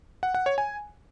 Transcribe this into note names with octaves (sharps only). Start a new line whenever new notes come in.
F#5
F#5
C#5
G#5